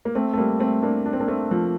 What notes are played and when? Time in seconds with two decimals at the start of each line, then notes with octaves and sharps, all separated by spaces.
0.05 A#3
0.15 A3 C4
0.33 A3
0.38 G3 A#3
0.60 A3 C4
0.82 A#3 D4
1.06 D4
1.13 C4
1.20 A#3 D4
1.28 A3 C4
1.51 F3 A3